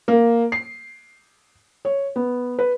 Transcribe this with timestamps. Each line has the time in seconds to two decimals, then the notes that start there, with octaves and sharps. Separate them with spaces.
0.08 A#3
0.52 C7
1.85 C#5
2.16 B3
2.59 B4